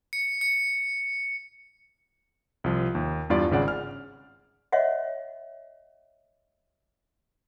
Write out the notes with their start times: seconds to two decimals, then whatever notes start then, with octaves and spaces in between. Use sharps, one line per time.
0.13 C#7
0.41 C#7
2.64 C2 F3
2.95 D#2
3.30 E2 G2 F4 D5
3.51 G#1 C#3 D5 F#5
3.68 F6
4.72 C#5 D#5 E5 F#5